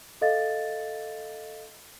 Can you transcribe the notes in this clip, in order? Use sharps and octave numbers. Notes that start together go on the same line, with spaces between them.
A4 D#5 F5 A6